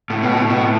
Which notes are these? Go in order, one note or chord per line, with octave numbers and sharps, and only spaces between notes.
A2
B2
A2
B2
A2